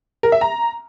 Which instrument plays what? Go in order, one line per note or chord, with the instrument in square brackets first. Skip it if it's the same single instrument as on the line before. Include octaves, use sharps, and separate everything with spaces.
[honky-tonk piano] A#4
E5
A#5